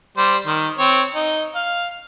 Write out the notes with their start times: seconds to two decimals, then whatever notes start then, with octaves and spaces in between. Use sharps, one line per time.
0.18 G3 C5
0.46 D#3
0.79 C4 C#5
1.15 D#4
1.55 F5